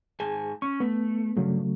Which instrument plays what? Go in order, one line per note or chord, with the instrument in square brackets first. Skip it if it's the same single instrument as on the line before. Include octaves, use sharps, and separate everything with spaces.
[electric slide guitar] G#2 G#5 A5 [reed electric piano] G#4
[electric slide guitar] C#4 [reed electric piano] C#6
[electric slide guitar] A3 [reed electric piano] B3
[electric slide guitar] G2 [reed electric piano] C#3 F#3 A3